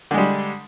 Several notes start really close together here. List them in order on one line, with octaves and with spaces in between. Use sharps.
D3 G#3 G3